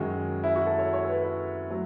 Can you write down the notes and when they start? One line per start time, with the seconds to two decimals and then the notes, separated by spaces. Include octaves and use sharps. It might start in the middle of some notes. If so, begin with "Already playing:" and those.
Already playing: F#2 D#3 G#3 F#4
0.44 E4
0.56 F#4
0.67 A4
0.78 C#5
0.93 C#5
1.04 A4
1.09 B4
1.24 E4
1.70 F#3 A3